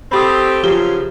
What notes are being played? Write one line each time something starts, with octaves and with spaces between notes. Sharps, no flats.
A3 C4 G4 B5 D#6
F#2 C#3 F3 G4 G7